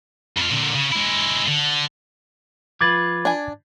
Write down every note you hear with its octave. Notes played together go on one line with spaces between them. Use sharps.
F2 F4
A#2 D3
C#3
G#3 E4
D3
F3 F4 B4 D6 G#6 A6
D4 G#5